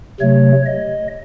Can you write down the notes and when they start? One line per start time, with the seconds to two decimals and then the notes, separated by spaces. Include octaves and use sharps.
0.20 C3 F#3 A3 C#5
0.66 D#5